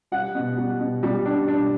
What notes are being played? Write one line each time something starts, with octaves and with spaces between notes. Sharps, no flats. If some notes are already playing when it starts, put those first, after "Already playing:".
G3 F#5
B2
G3
B2
G3
D4
D4